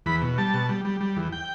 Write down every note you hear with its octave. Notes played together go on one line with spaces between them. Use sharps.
E2 B5
B2
G3 A5
B2
G3
G3
G3
E2
G5